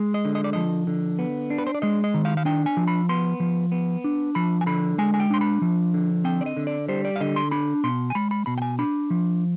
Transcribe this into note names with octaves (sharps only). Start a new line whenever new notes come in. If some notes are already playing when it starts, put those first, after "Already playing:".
Already playing: G#3
D#5
D3
D#5
D5
F3 D#5
D3
B3
D4
B4
C5
D5
G#3 D#5
D#5
D#3
F5
F5
D4 G5
G#5
F3
B5
B3 C6
F3
B3
D4
F3 B5
G#5
D3 B5
G#3 G#5
G#5
G5
D4 C6
B5
F3
D3
C4 G5
D5
D#5
D3
D5
G3 C5
D5
F5
D3 D#5
C6
D4 B5
B2 C6
G#5
G#3 B5
B5
B2 B5
G5
G#5
D4 B5
F3